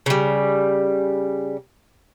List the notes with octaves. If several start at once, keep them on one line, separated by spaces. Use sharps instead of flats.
C#3 G3